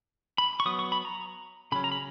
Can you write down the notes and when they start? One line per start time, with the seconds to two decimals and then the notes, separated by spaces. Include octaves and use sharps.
0.38 B5
0.60 C#6
0.66 F#3 B3 D#6
0.79 C#6
0.92 B5
1.05 A#5
1.72 C#3 F#3 C#4 B5
1.84 A#5
1.92 B5